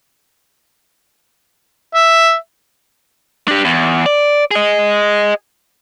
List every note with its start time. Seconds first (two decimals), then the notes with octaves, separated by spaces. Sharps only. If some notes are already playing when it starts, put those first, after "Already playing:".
1.94 E5
3.48 D4 G4
3.65 E2
4.06 D5
4.51 G#4 D#5